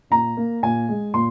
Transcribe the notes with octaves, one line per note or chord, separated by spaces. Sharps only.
A#2 A#5
A#3
A#2 G#5
G#3
A#2 C6